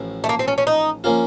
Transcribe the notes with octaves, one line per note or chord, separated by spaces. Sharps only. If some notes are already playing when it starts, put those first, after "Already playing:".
Already playing: A1 A2 F3
A3
A#3
C4
C#4
C#4
D#4
F3 A#3 C#4 F4